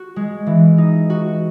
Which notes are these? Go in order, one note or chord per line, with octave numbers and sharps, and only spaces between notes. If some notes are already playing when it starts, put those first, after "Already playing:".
Already playing: F#4
G#3
E3
D#4
F#4